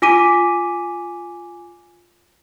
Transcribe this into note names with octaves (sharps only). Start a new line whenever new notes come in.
F4 G#5 D6 B6 D#7